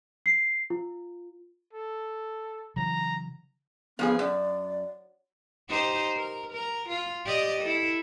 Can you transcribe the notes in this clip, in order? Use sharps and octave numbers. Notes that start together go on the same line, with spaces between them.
C7
F4
A4
C#3 E3 F#3 A#5
G2 F3 B3 G#4
F#2 D5
D#4 G4 C5
A#4
A#4
F4
G4 D5 D#5
E4 A4